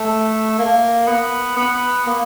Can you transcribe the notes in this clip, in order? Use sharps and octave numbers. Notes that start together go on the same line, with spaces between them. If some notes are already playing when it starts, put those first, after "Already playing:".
Already playing: A3
A#3
B3
B3
A#3